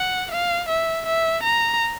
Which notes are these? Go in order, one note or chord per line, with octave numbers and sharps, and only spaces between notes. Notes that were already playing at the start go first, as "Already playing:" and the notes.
Already playing: F#5
F5
E5
E5
A#5